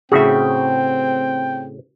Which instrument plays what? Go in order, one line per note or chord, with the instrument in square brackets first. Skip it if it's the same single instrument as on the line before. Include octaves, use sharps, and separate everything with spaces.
[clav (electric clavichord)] A2 C#3 F#4 [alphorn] C4 [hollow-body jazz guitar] G#4 E5 [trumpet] G5